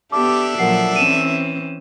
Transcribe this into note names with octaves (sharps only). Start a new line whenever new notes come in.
B3 D4 G4 A4 E5 D6
A#2 F3 F#3 A#4 F#5 C7
E3 C4 C#4 D#7 E7